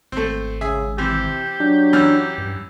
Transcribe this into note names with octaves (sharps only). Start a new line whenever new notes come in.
G#1 A3 C4
C#3 G#4 E5
C3 E3 C4 G4
F#3 D4
F#2 E3 F6
G2